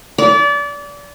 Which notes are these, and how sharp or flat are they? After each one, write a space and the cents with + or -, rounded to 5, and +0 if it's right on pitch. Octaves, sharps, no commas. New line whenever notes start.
D5 -30